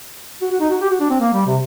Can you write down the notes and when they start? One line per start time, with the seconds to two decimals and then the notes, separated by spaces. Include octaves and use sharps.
0.41 F#4
0.52 F#4
0.60 D#4
0.70 F#4
0.81 G4
0.91 F#4
1.00 D4
1.10 C4
1.20 A#3
1.33 G3
1.47 C3